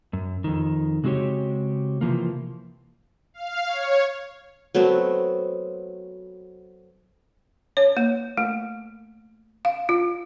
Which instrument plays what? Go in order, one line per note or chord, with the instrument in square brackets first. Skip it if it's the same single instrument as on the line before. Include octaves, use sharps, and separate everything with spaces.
[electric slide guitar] F#2
F2 D#3
C#3 G#3 C4 F#4 G4 C#5
C3 E3 F3 A#3
[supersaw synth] F5
C#5
[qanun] F#3 A3 B3 C4
[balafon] C#5
A#3
A3
F5
F4